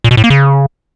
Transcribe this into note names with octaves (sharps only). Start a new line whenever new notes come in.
A#2
B2
A2
A#3
C#3